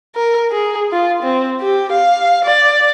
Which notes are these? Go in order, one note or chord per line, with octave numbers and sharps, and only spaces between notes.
A#4
G#4
F4
C4
G4
F5
D5